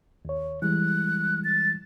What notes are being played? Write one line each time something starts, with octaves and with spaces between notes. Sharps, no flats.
D#2 C#5
E3 G3 G#3 F#6
A6